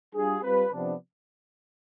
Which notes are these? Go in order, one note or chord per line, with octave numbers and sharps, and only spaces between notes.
G3 D4 F4 G#4
G3 C4 F4 B4
C3 F3 B3 D4